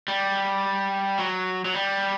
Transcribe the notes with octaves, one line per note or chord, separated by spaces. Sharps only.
G3
F#3
F#3
G3